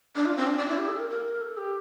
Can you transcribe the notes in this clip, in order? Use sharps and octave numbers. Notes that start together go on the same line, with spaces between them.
D4
F4
C4
D4
D4
E4
G4
A4
A#4
A#4
A4
G4